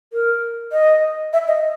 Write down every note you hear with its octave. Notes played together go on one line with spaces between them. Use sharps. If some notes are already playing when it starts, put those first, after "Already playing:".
A#4
D#5
E5
D#5